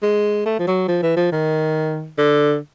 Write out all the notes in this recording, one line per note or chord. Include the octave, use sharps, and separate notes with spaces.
G#3
A3
F3
F#3
F3
E3
F3
D#3
D3